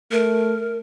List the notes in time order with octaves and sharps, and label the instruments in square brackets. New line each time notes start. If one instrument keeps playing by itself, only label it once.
[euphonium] A3 [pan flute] A#4